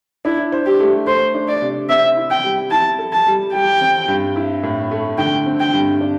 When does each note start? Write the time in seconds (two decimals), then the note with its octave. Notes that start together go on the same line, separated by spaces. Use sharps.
0.25 D4 E4
0.52 C5
0.66 G4
0.80 A3
1.07 A3 C5
1.35 D4
1.48 D5
1.62 C3
1.89 C4 E5
2.17 E4
2.31 G5
2.44 G3
2.71 E4 A5
2.99 A4
3.12 A5
3.27 G3
3.54 G3 G5
3.81 C4
4.08 G2
4.36 E4
4.63 A2
4.91 A3
5.18 D3 G5
5.46 C4
5.60 G5
5.73 G2
6.01 D4